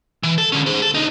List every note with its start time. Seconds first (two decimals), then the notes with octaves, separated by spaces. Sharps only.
0.23 E3
0.38 A4
0.52 D3 C#4
0.66 G#4 C5
0.82 A4
0.95 D4 D#4